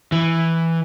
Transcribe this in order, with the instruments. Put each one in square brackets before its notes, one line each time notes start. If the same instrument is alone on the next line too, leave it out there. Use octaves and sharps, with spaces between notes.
[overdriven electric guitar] E3